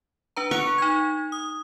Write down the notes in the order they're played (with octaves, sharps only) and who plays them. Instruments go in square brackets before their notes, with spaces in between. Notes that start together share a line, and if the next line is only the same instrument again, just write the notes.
[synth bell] D4 B4 A#5
[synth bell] F#5 F#6 F7 [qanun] C#6
[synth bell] D#4 G#6
D#6